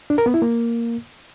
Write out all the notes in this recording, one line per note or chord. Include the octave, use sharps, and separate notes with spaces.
D4
A#4
B3
E4
A#3